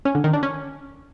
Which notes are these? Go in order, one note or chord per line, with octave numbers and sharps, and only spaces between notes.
C#4
D3
D#3
D4
C#4